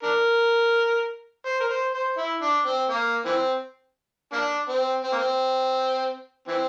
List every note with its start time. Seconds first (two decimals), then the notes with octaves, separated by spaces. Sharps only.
0.03 D4 A#4
1.46 C5
1.60 A#4
1.70 C5
1.94 C5
2.18 E4
2.42 D4
2.66 C4
2.90 A#3
3.26 E3 C4
4.33 A#3 D4
4.69 C4
5.04 C4
5.12 A#3
5.18 C4
6.48 E3 C4